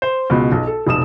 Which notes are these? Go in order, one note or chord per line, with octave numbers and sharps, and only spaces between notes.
C5
C#2 B2
B1
A4
F1 B1 D#6 E7